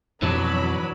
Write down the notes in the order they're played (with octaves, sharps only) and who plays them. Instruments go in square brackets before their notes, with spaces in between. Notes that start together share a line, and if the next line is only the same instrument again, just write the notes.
[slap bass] F2 G#2 B2 [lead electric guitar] E3 D4 [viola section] F#3 B5